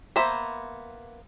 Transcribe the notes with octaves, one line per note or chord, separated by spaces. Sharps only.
A#3 B3 C5 E5